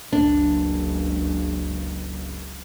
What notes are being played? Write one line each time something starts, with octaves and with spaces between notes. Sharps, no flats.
F#1 C#2 D4